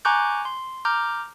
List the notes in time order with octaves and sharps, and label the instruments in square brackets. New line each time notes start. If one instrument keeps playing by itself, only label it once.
[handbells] G#5 A#5 C#6 D6 F#6 G6
C6
A#5 D6 F6 G6